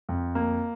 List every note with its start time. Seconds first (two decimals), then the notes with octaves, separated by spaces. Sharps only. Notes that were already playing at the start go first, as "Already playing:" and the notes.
0.09 F2
0.35 A#3